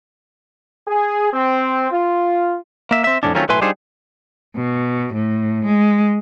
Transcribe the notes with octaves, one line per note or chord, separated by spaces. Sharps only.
G#4
C4
F4
A#3 E5
C4 E5
F2 A2 C3 C#4 D4
D#3 F#3 A3 C4 C#4 F4
B1 A2 B4 E5 G#5 C6
G3 D4 D#4 F4 G#4 C5
B2
A2
G#3